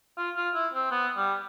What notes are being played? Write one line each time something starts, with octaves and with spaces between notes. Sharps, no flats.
F4
F4
E4
C4
B3
G3